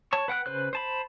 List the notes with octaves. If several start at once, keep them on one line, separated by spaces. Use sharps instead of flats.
C#5 A5 C#6
B4 F#5 G5 F#6
C#3 B4 C5 F#6
C5 A5 B5